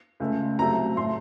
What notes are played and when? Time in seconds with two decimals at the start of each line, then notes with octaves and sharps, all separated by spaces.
0.20 C#2 C#3 A3
0.59 C2 C3 F#3 A3 A#5
0.96 A2 A3 C6